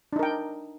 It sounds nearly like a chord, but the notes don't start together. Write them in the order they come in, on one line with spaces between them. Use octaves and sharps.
D4 D#4 A#4 G5